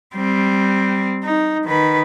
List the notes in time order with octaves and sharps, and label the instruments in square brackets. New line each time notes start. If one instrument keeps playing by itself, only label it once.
[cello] G3 C4
D#4
D#3 B4